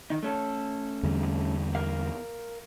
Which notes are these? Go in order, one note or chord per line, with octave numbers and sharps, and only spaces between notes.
D#3 D#4
A3 C#4 A4
E2 D3 G3
A#4 F5